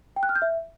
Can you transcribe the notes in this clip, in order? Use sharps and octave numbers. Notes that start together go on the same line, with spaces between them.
G5
F#6
F6
G6
E5